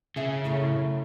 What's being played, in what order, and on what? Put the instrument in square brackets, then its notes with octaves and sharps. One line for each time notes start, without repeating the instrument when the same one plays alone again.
[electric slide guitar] C#3 [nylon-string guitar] G#4 E5
[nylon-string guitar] F#2 A2 E4